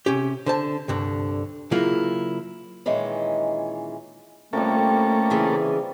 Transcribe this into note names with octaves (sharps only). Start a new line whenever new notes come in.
C3 C#4 G4
D3 C5 A5
C2 G2 D3
C#3 F#3 A#3 E4 F4
A#2 D#3 E3 G#3 C#4
C3 F3 G3 A3 A#3 C#4 A4
C#3 E3 G#4